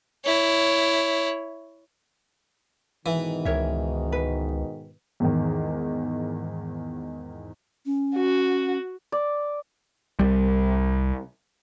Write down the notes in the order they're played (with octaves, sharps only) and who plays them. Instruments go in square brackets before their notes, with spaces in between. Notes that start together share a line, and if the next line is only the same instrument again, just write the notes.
[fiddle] E4 C#5
[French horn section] G#2 B2 D#3 [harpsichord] E3 [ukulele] E5
[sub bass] C#2 [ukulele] A#4 C#5 E5
[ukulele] B4
[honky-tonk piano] E2 G#2 D#3
[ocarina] C#4
[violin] F#4
[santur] D5
[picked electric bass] C2 G3